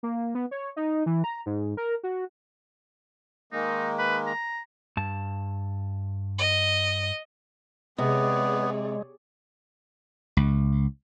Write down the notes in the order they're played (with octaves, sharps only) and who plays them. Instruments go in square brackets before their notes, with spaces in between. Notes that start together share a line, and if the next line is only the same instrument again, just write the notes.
[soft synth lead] A#3
B3
C#5
D#4
E3
A#5
G#2
A#4
F#4
[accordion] D#3 G#3 A#3 [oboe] D#4
[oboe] B4
A#5
[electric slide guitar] G2 A5
[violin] D#5
[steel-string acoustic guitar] C3 [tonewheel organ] G#3 [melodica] B3 [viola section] G#4 C#5 D5
[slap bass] C#2